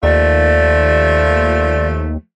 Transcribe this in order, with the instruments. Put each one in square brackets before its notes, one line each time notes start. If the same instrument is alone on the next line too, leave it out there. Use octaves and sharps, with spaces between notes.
[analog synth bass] D#2 [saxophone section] F3 A3 F4 [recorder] D5